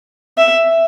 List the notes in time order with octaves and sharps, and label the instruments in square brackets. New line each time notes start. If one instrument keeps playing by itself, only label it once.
[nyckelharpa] E5